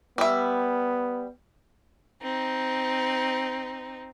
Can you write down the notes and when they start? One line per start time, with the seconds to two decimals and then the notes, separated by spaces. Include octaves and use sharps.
0.18 G3 B3 E5
2.22 C4 D#4